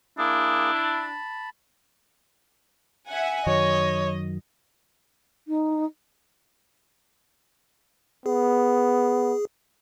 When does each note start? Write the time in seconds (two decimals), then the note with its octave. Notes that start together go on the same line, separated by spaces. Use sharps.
0.18 A#3 D4 E4 G#4
0.74 A5 B5
3.08 E5 F#5 G#5
3.46 F#2 D#3 F#3 C#5 D#5
5.47 D#4
8.26 B3 G#4